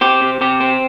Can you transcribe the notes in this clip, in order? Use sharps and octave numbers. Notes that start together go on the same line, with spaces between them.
C4 G4
C3
C3 G4
C4